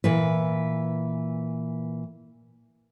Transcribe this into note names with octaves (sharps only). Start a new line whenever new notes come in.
A#2 E3 B4